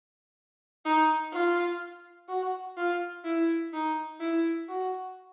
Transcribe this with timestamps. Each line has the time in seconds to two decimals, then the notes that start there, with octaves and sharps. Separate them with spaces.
0.85 D#4
1.33 F4
2.28 F#4
2.77 F4
3.24 E4
3.73 D#4
4.20 E4
4.68 F#4